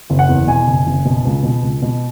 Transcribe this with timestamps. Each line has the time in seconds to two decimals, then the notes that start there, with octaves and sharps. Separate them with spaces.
0.10 F#1
0.19 F#5
0.29 E2
0.47 B2 G#5
0.67 F#1
0.87 F#1
1.05 B2
1.25 C#2
1.43 B2
1.62 C#2
1.82 B2